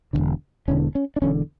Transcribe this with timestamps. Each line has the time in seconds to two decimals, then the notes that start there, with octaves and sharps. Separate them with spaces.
0.13 E1 E2 D3
0.68 E1 E2 D3 C#4
0.95 C#4
1.16 D4
1.22 E1 E2 D3 C#4